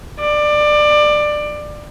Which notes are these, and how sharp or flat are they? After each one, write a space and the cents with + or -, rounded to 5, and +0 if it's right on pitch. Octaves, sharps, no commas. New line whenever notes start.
D5 +20